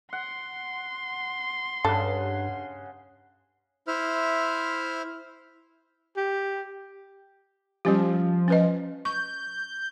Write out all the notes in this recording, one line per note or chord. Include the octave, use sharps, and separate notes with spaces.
F#5 C6
G2 C#3 A4 F#5
E4 C5 E5 F6
G4
F3 G3 C#4 G4
C#4 B4 D#5
C#6 G6